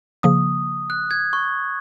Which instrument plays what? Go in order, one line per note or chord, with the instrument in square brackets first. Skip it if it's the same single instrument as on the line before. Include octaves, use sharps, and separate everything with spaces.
[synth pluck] C#3 F3 A#3 [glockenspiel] D#6
[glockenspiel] F#6
G#6
C#6